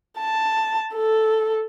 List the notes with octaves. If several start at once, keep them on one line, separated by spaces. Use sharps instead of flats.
A5
A4